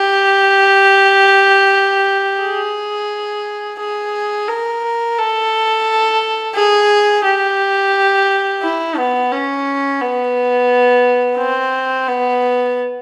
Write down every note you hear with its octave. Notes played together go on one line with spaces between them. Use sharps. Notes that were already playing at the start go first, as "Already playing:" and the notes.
Already playing: G4
G#4
G#4
A#4
A4
G#4
G4
E4
B3
C#4
B3
C4
B3